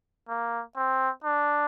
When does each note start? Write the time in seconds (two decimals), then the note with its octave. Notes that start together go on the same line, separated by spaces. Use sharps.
0.29 A#3
0.77 C4
1.24 D4